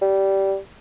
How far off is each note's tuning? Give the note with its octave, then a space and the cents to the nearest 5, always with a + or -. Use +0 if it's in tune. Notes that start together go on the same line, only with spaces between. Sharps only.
G3 -15